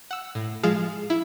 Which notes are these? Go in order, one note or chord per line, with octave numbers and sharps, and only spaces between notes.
F#5 E6
A2
F3 G#3 G#4 F5 F6 E7
E4